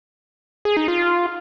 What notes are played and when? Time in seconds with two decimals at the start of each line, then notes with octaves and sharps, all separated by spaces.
0.65 G#4
0.77 D#4
0.88 F4